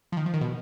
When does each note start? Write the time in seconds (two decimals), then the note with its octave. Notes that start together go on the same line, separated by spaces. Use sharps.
0.12 F3
0.17 D#3
0.26 F3
0.34 D#3
0.41 B2